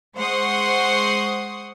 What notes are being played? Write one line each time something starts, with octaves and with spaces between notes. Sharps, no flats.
G#3 C5 F#5 C6 C#6 D#6